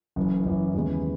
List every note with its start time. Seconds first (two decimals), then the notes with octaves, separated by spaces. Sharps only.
0.16 F#1 F#2 E3
0.45 F#1 F#2 E3
0.74 D#2 C#3 E3 G#3 B3